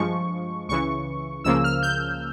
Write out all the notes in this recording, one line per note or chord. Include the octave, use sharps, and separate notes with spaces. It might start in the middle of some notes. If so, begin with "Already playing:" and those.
Already playing: G2 F3 G#3 C#6
C#2 C#3 E3 C#6
C#2 C#3 F3 A#3 E6
F6
G6